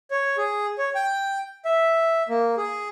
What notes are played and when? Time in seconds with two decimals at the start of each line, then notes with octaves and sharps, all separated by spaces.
0.11 C#5
0.37 G#4
0.78 C#5
0.95 G5
1.65 E5
2.29 A#3
2.57 G#4